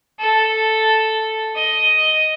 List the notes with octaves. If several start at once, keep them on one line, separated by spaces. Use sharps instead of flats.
A4
D#5